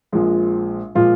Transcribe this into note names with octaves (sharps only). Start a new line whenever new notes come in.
A#1 A#2 F3 G#3
A#2 F3 G#3 F4